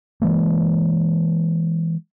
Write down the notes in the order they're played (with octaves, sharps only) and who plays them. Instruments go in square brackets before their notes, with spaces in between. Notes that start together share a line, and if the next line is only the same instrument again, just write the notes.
[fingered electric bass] E3 G#3 A#3